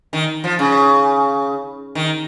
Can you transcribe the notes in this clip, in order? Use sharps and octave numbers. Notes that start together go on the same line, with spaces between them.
D#3
F3
C#3
D#3